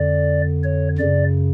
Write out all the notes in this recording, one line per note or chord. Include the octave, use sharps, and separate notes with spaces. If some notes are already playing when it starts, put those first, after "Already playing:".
Already playing: F2 D3 D5
C#5
F#2 C#3 D5